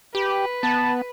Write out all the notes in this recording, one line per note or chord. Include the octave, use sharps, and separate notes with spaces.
G4 B4
B3 A5